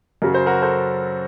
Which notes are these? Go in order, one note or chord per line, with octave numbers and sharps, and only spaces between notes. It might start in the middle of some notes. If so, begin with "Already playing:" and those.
F#2 C#3 F#3 A#4
C5
F#4 A#4
A4 C5